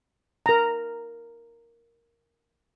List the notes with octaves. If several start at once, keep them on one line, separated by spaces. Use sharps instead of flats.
A#4 A#5